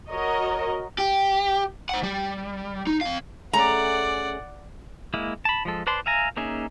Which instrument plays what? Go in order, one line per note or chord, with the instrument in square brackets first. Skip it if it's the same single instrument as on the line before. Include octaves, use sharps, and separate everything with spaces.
[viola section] F#4 A#4 C#5 D#5
[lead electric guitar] G4
C5 F#5
G3
D#4
C4 F5
[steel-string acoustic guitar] A3 C#4 G#4 [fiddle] D5 F#5 [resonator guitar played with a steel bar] A#5
[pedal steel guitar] G#3 A#3 E4
A5 B5
F3 G#3 A4
B4 C5 D5 A5 C6
E5 F5 G#5 A#5
A#3 C#4 D#4 G#4 E5